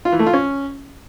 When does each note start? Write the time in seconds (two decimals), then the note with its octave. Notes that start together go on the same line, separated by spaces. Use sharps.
0.05 F4
0.12 E3
0.19 A3
0.26 F4
0.34 C#4